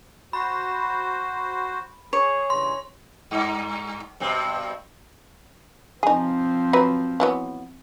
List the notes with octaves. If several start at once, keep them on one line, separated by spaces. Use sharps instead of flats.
F#4 C5 B5
G#4 C#5
G2 C#3 E3 C6
G2
G2 B2 C4
F3 C4 D#4 G#4
F#3 B4
E3 F#3 B3